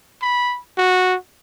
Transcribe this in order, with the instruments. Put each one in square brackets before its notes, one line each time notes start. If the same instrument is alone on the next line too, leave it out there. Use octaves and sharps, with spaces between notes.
[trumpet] B5
F#4